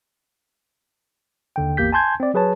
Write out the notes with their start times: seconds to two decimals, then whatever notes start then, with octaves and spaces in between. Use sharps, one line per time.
1.56 D#2 D3 G5
1.77 A1 E2 A#3 G4 G6 B6
1.92 G#5 A5 C6 G6 G#6
2.20 C4 D5
2.34 F#3 G#4 B4 C#5 A5